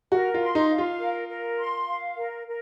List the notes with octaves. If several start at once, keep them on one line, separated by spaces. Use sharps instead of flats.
F#4 A#4
F4
C6
D#4
F5
F4
A#4
A#4
C6
F5
A#4
A#4